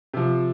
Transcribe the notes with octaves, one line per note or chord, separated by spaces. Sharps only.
C3 F3